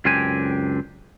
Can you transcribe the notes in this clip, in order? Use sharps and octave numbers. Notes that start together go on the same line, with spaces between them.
C#2 F#2 C4 D4 G4 G#5